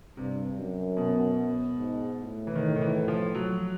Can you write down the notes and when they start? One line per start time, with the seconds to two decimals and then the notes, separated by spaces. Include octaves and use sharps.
0.17 G2 C3
0.56 F#2
0.97 B2
1.76 G#2
2.16 A2
2.47 E3
2.55 D#3
2.76 D#3
2.81 E3
3.08 F3
3.35 F#3